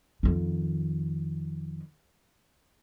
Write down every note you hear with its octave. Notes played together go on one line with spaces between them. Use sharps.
F2 D#3